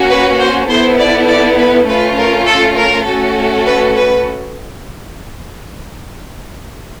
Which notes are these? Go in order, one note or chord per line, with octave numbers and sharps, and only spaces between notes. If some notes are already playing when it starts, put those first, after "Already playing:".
Already playing: A#3 C#4 F#4
B4
C5
B3 E4 A4 C5
D5
D5
B4
A3 C#4 F4 B4
A#4
A4
A#4
A3 C#4 F#4 A4
B4
B4